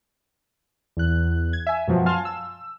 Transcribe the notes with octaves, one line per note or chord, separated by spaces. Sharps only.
E2 F#6
G#6
E5 G#5
F#2 B2 F3 F#3
F5 G#5 A5 C6 F6
E6